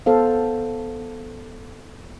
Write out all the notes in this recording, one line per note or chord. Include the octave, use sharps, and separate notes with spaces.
B3 A4 C5 F5